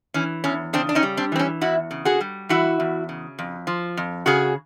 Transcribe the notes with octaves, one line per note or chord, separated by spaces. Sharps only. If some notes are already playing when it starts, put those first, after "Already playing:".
E3 C#4
E2 C#4
C#3 C4 D4
D4
C#4 D#4
G3
C4 D4
E3 C4
C#4
E2 E4 F#4
C#3
F#4 G#4
G3
E3 E4 F#4
E2
C#3
F2
F3
F2
C#3 F#4 G#4